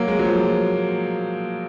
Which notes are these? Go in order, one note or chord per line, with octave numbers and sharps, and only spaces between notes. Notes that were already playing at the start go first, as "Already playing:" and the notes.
Already playing: F#3 A#3
G#3
F#3
F3